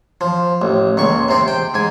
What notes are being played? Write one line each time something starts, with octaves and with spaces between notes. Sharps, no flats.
F3
A1
C#2 A#2 C#6
C3 C4
G5
G#2 G#5